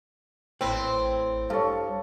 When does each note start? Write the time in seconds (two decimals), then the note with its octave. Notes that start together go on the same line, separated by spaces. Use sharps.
0.61 A1 A2 C4 B4 G5
1.50 G2 A4 C#5 F5 A5